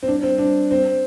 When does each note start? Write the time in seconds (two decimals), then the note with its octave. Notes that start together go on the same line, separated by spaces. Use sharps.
0.03 C4
0.08 D4
0.23 C4
0.38 D4
0.71 C4